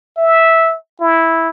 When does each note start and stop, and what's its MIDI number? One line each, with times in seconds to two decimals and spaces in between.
0.17 0.76 76
1.01 1.50 64